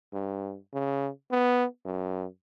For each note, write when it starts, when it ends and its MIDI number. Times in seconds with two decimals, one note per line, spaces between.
0.13 0.57 43
0.73 1.10 49
1.31 1.65 59
1.85 2.26 42